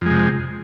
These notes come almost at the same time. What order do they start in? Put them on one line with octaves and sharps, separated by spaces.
F2 G#3 C3